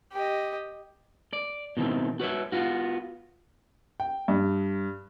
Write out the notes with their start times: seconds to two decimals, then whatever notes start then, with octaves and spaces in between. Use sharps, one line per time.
0.13 G4 D#5
1.33 D5
1.77 B2 D#3 E3 C4
2.20 F#4 B4 C#5 E5
2.52 B3 F4 F#4
4.00 G5
4.28 G2